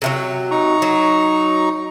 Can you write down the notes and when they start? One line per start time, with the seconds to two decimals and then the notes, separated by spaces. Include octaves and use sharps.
0.02 C3 D#3 F#3
0.51 D#4 A#5 C#6
0.82 F#3